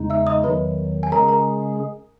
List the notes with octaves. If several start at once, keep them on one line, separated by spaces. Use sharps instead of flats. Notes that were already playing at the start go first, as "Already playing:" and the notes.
Already playing: E2 C#3 G#3 D#4
E5 E6
D#5 D#6
E2 D#3 F#3 B4 B5
G#5
C#3 G#3 C#4 G#4 A#4 A#5
A#4 A#5